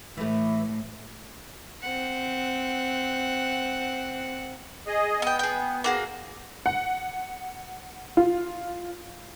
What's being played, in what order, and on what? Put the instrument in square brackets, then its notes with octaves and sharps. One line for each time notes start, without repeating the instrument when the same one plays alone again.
[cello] A2 [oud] E3 A3
[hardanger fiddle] C4 F#5
[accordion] G#4 D#5
[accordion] B3 [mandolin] D#5 G5
[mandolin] G#4 G5
A#3 F#4 G#4
[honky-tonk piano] F#5
F4